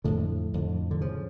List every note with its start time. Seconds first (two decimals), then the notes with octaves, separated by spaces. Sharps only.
0.04 F2 A2 D3 A3
0.54 F2 D3
0.91 D3
1.01 C#3 F3